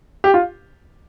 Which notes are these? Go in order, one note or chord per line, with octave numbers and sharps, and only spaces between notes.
G4
F4